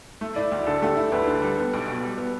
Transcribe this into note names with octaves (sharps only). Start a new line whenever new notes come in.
A3
E4 D5
D2
D3 A4
A3 G4
E4
D2 B4
D3
G3
B3
B1
B2
G3
B3